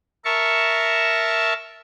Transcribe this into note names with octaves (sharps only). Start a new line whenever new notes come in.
A#4 E5 A5 C#6